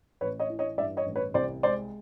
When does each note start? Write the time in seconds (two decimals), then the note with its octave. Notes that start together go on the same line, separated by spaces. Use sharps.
0.21 A1 B4 C#5
0.40 C#5 D#5
0.50 E3
0.59 C#5 D#5
0.78 G2 D5 E5
0.97 C#5 D#5
1.06 A1
1.16 B4 C#5
1.34 C2 C5 D5
1.63 G#3 C5 D5